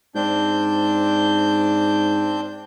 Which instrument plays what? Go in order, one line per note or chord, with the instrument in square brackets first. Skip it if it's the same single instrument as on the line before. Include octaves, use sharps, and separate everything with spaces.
[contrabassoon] G#2 [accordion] C4 D4 G6